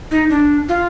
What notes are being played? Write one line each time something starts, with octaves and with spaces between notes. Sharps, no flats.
D#4
D4
F4